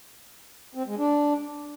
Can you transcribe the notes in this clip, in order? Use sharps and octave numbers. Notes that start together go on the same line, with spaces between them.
C4
G#3
D4